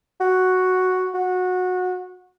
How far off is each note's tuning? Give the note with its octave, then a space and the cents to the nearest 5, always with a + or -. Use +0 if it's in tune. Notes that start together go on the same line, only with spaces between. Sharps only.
F#4 +0
F#4 -20